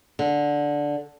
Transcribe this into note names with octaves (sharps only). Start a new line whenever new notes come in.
D3